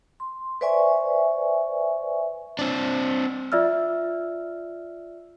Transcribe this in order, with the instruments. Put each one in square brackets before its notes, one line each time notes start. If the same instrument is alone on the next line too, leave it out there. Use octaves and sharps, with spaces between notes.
[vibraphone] C6
B4 C5 D5 E5 G#5 C#6
[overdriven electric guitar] C4 D4
[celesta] F4 D5 E5 E6 F6